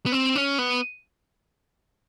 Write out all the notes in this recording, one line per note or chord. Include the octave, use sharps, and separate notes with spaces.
B3
C4
C#4
B3